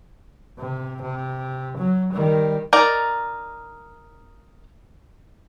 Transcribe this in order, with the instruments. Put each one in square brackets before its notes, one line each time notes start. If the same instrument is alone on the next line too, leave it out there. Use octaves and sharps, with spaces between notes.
[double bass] C3
C3
F#3
D#3 G3
[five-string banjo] D#4 A#4 D5